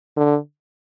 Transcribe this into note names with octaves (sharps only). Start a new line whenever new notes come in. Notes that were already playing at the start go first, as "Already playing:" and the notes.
D3